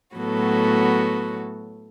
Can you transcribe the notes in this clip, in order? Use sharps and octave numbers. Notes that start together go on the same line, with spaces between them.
A2 F#3 B3 F#4 A4